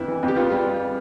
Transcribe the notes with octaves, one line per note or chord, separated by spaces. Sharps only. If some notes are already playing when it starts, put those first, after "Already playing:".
Already playing: F2 D3 B3 E4
E3
F2
G4
B3 F4
G3